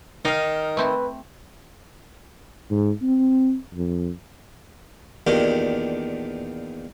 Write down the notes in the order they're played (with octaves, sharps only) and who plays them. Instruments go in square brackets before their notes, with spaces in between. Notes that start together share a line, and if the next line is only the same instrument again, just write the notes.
[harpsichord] D#3 [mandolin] D#4 F5
[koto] A3 C4 E4 [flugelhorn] B4
[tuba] G#2
C4
F2
[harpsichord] E2 A#2 D#3 D4 G4